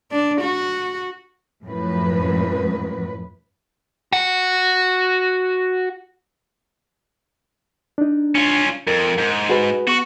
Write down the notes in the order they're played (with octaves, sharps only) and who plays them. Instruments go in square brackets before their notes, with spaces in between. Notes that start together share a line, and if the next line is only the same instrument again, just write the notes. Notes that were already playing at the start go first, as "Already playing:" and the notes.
[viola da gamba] D4
F#4
[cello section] F#2 A2 F3 B4
[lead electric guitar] F#4 F#5
[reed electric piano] D4 D#4
[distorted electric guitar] C#4 F4
[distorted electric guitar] F2 [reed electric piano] A#4
[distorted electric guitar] G#2
[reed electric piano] F#4 G#4 B4
[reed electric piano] B3 C#6 [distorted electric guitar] F#4